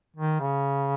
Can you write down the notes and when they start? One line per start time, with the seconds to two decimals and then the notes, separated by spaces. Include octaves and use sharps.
0.16 D#3
0.40 C#3